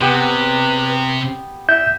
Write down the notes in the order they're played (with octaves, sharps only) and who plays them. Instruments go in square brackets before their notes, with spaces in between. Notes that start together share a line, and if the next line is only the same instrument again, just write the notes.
[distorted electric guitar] C3 [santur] B3 G4 [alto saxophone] B4
[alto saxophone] E5 [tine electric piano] G6